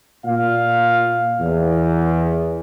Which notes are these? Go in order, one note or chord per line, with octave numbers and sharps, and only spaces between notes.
A#2 F5
E2